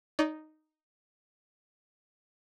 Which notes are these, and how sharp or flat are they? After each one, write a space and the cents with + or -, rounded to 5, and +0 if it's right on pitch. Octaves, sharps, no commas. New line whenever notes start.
D#4 -5 D5 -40